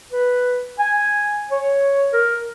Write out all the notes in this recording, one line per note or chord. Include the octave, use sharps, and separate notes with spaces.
B4
G#5
C#5
A#4